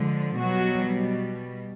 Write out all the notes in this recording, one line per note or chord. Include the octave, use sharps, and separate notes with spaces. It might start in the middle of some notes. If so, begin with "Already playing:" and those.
Already playing: D3 F3 G#3
B2 F#3 G3 F#4